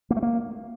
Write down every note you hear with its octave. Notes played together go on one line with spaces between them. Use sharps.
A#3
A3
A#3